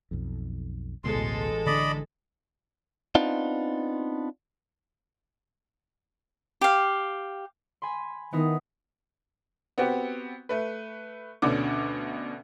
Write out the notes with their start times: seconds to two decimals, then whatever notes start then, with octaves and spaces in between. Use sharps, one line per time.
0.11 B1 F2
1.04 A1 D2 B2 G#3 A4 C6
1.66 D3 C4 D4 D5 D#5 B5
3.15 B3 C4 D4 D#4 F4
6.61 G4 F5
7.82 G#5 B5 C6
8.33 D#3 B3 D#4 E4
9.78 B3 C4 F#4 G4
10.49 A3 B4
11.42 D2 B2 D3 C#4 D5 D6